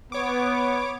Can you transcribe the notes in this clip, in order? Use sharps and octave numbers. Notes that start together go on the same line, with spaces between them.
B3 C#5 D6